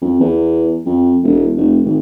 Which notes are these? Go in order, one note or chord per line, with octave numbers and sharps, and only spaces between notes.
F2
E2
F2
E1
F1
G#1